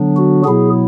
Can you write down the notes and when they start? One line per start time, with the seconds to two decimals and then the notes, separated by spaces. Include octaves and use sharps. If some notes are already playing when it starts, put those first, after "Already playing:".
Already playing: D3 F#3 B3 D4
0.17 F#4
0.44 B2 F#3 B3 E4 G#4